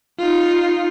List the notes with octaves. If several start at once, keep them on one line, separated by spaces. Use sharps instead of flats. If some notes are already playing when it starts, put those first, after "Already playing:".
D#4 F4